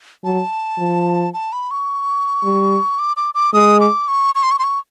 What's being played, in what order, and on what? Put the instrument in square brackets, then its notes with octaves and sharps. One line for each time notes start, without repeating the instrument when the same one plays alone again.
[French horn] F#3 [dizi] A5
[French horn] F3
[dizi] A5
B5
C#6
[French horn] G3
[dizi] D6
D6
D6
[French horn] G#3 [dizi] D#6
[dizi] D6
C#6
C#6
C6
C#6
C6
C#6